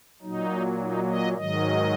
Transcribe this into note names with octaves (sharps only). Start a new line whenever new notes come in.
A#2 F#3 D#4
D#4
D#5
G#2 D#3 F#3 D#5